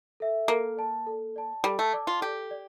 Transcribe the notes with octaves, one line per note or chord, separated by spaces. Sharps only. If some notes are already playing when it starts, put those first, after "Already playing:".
A4 E5
A#3 A4
D5 A5
A4
D5 A5
G3 A4
A3
D5 A5 D6
F4
G4 A4
D5